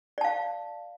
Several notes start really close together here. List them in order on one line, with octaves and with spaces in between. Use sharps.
D5 A5 F5